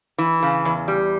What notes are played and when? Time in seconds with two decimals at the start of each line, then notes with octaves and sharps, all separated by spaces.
0.18 E3
0.43 C#3
0.65 E2
0.88 G3